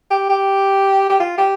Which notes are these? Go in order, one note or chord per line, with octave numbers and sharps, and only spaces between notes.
G4
G4
G4
F4
G4